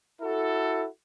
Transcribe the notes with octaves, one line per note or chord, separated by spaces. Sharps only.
E4 F#4 A4